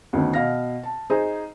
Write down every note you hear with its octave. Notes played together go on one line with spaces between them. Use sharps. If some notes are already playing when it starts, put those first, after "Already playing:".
D2 D#3 B3 C#4
B2 F5 F6 A#6
A5
D#4 G#4 C5 A#5